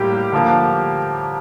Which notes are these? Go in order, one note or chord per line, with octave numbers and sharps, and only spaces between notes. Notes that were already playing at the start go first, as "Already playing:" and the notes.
Already playing: A2 G3 A#3 G4
D3 F3 A#3